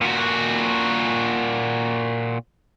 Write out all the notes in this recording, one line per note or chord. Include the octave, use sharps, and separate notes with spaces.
A#2 F#4